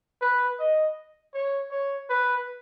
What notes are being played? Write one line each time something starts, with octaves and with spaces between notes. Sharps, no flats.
B4
D#5
C#5
C#5
B4